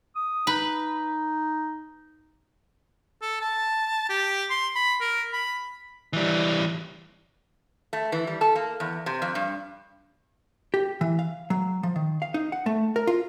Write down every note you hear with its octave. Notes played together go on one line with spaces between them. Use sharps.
D#6
D#4 B4
A4
A5
G4
C6
B5
A#4
B5
E3 G3
A3
E3
G3
A4
A#3
E2
C3
F2
G2
G4
E3
F5
F#3
F3
D#3
F5
D#4
F#5
A3
A#4
F4